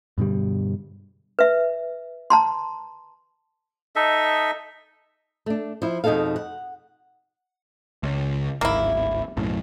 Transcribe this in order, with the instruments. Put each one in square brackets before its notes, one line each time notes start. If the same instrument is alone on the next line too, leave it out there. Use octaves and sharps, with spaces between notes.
[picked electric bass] G2 B2 D3 G3
[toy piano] B4 E5
A5 A#5 C6
[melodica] D#4 A4 D#5 E5
[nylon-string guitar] A3 D4
F3 E4
F2 B2 D#4 G#4 A4 F5
F#5
[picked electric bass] C#2
[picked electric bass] D1 G#1 [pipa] A#3 E4
[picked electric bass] B1 F#2 A2